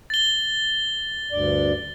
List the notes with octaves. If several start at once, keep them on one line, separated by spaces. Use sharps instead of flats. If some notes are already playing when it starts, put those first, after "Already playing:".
A6 G7
D2 G2 D5